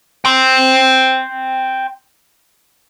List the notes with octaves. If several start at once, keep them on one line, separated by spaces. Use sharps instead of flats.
G5 C6